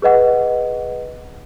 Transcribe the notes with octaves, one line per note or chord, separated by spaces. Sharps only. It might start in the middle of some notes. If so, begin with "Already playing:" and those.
G#4 B4 D#5 F#5